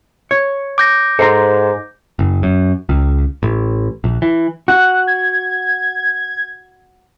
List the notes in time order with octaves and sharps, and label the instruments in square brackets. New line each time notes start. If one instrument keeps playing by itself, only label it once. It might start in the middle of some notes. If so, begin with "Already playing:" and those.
[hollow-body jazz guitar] C#5
[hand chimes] D6 G6 A#6
[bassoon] G#2 [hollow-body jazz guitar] A4 C5 A#5
[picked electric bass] F#1
F#2
C#2
A1
A#1
E3
[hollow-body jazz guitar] F#4 [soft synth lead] F#6
[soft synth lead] G#6